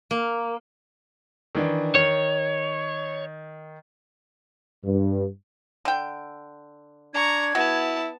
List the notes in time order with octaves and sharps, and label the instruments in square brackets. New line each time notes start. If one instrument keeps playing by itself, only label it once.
[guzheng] A#3
[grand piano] D#3 E3 D4
[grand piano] D#3 [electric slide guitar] C#5
[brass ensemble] G2
[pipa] D3 G5
[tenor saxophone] D4 [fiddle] A#5 C#6 [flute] G#6
[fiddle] B3 A5 [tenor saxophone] E4 [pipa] F#4